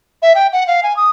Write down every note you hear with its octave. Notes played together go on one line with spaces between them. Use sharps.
E5
G5
F#5
F5
G#5
D#6